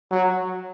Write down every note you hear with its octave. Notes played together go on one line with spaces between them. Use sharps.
F#3